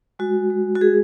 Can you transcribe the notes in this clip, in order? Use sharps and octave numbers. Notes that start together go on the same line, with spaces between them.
G#3 F#4
G#3
F#4
G#3 G#4